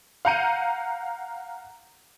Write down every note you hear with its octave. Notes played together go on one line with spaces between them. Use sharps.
F5 F#5 A#5 G6 C#7 D#7